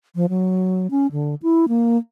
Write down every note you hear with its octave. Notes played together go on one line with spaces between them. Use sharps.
F3
F#3
C#4
D3
E4
A#3